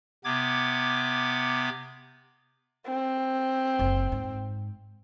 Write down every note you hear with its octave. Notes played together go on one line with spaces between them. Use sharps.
C3 B3 D6 G#6
C4
F#1
G#2